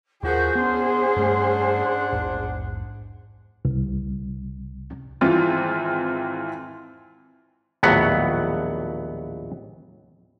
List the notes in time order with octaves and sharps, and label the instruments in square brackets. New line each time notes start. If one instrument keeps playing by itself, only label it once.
[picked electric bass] D#2 [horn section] F3 F4 F#4 [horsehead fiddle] G#4 C5 [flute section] A#4 G6
[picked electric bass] B3 [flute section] C#4 C6 [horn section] D4 F#5
[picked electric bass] G2 A3
A#1 E2 G#2
[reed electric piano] C2
[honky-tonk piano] G#1 E3 C4 F4 A6
[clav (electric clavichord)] A#1 D#2 A2 F#3 B3 F#5